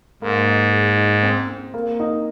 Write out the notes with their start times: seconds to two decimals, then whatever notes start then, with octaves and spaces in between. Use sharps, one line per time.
0.22 G#2 A#3
0.48 D#5
0.72 G#4
0.97 D#4
1.23 C4
1.49 C4
1.74 A#3
2.00 D#4